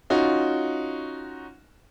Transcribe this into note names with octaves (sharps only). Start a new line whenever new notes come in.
C#4 D#4 F4 F#4